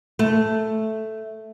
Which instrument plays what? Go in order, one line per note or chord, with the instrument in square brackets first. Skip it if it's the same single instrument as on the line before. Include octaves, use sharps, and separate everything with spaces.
[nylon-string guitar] A3